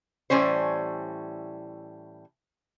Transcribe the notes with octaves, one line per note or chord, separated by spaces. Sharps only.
A2 E3 G3 C#4 C5